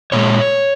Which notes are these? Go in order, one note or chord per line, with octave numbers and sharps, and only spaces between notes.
A#2 G#3 C#5